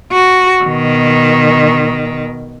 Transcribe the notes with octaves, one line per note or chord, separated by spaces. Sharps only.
F#4
B2 D#3